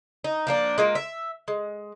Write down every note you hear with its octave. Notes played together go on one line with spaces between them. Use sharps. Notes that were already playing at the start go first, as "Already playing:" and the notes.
D#4
F3 A#3 D4
G#3 A#3 F4
E5
G#3